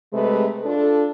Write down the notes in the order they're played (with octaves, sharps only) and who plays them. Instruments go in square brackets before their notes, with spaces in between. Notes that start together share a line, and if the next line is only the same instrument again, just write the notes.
[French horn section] C3 G#3 A3 G#4 B4
D4 F4 A4